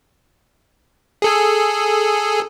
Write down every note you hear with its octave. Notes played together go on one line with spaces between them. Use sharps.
G#4 A4 G#5